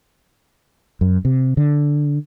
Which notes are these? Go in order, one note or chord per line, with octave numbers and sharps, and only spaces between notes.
F#2
C3
D3